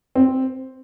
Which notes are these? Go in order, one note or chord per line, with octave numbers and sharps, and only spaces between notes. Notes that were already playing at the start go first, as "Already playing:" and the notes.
C4